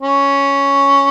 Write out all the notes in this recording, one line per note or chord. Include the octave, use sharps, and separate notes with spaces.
C#4